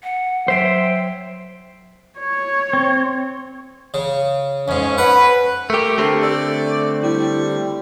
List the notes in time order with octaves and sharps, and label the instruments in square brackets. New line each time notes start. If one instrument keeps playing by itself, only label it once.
[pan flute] F#5
[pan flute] F#3 [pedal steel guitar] C5 E5 G5
[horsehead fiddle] C#5
[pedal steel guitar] C4
[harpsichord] C#3
[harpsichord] F2 G#2 [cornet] C#4
[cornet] B4 [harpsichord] F#5
[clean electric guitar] A3 G4 [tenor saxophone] A#4
[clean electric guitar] D3 A3 C4 [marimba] G4
[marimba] A4 E6 [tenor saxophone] D5
[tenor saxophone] G3 [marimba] E4